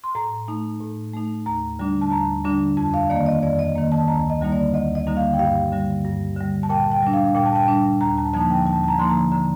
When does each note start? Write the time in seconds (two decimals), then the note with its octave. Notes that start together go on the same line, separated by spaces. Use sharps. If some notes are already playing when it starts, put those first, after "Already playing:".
0.04 C6
0.15 A2 A#5
0.48 A3 D#4
0.81 A2
1.13 A3 D#4
1.46 D#2 A#5
1.79 D3 G3 D4
2.01 A5
2.11 D#2 A#5
2.44 D3 G3 D4
2.77 F2 A5
2.94 F5
3.10 D#3 A#3 D5
3.26 D#5
3.43 F2 D5
3.59 D#5
3.76 D#3 A#3
3.92 A5
4.08 D2 A#5
4.30 D#5
4.41 D3 G3 A#3 D#4
4.52 D5
4.73 D2 D#5
4.95 D#5
5.07 D3 G3 A#3 D#4
5.17 F5
5.33 G5
5.39 G2 F5
5.72 D3 G3
6.05 G2
6.37 D3 G3
6.63 A5
6.70 A#2 G5
6.92 G5
7.02 G3 D4
7.13 F5
7.35 A#2 G5
7.46 A5
7.56 G5
7.68 G3 D4
8.01 D#2 A#5
8.18 A5
8.34 D3 F3 A#3 D#4 A5
8.50 G5
8.66 D#2 A5
8.84 A5
8.88 A#5
8.99 D3 F3 A#3 D#4 C6
9.10 A#5
9.32 D3 A#5